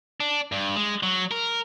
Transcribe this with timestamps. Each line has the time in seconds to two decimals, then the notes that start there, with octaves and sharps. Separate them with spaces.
0.20 D4
0.52 G2
0.76 G#3
1.03 F#3
1.31 A#4